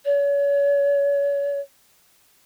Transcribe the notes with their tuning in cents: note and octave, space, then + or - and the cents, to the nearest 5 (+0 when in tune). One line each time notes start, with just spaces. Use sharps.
C#5 +35